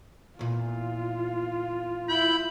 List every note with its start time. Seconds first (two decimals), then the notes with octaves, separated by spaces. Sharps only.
0.39 E2 A#2 F4
2.09 E4 B5 G6